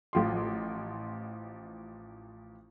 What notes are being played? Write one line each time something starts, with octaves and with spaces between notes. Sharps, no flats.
A1 F3 C6